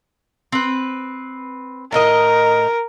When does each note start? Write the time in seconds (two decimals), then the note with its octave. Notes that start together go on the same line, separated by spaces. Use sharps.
0.52 C4 B4
1.92 A2 D#4 A#4 D#5